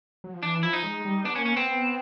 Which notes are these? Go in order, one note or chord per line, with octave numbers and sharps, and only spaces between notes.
F#3
F3
E3 D4
F3 E4
D#4
G#3
G3
B3 D4
C#4
A#3
C#4
B3 C4
B3